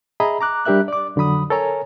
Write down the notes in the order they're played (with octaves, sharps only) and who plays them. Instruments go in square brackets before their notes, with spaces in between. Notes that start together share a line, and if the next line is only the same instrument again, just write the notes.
[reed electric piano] G#4 D#5 E5 A#5 B5
A#5 D6 F#6
G3 D4 G4 A#4 E5 F#6
D5 D6
F2 D3 F#3 B5 D#6
A4 A#4 C#5 G#5 A#5